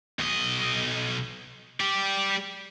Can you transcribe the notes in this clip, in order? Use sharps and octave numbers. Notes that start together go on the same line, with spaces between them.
B1 D#5
G4 D5